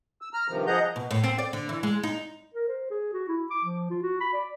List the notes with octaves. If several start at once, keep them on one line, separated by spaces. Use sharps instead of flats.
E6
A#5 F6
G2 C3 D#3 F3
F3 G#4 D#5 F#5 A#5 G6
B2
A2
C4
D5
D3
E3
G#3
D#4
A#4
C5
G#4
F#4
E4
D6
F3
F4
F#4
B5
D5